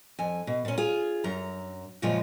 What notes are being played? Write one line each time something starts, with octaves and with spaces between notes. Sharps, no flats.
F2 G#5
B2
A#2 C#4
F4 G#4
F#2 A#5
F#2 A#2 C#3 F3 G#3 F4